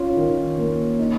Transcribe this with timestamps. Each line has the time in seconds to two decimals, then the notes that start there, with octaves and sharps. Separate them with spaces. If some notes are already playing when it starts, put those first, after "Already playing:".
Already playing: C#4 F4
0.16 D#3
0.58 A#3
0.99 D#4